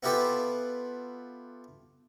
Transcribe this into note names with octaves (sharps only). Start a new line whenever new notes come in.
B3 E4 F4 G4 A4 B4